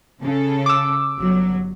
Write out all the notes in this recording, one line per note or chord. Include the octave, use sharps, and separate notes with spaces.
C#3 A4
D6 E6
G1 F#3